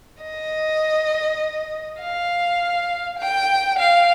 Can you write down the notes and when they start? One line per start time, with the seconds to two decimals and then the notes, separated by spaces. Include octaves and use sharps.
0.22 D#5
2.00 F5
3.19 G5
3.78 F5